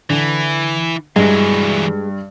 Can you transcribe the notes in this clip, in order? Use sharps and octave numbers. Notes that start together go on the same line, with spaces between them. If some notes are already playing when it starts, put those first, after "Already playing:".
D3 E3
G2 E3 F#3 G#3